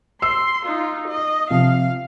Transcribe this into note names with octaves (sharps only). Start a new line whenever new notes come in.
C6 E6 C7
D#4 F4
D#5
C3 F3 F5